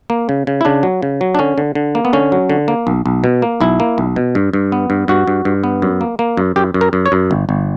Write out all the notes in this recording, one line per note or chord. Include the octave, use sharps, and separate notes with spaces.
A#3
C#3
C#3
E4
C#3 D4
F#3
C#3
F#3
D4
D3 C#4
D3
D3
A#3
B3
D3 C#4
F#3
D3
A#3
B1
B1
B2
A#3
B1 E4
A#3
B1
B2
G2
G2
B3
G2
G2 F#4
G2
G2
B3
F#2
A#3
A#3
F#2
F#2 G4
F#2
A#4
F#2
C#5
F#2
G1
G1